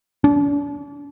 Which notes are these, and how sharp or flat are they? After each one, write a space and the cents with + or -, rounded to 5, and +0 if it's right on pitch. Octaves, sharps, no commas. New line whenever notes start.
D4 -40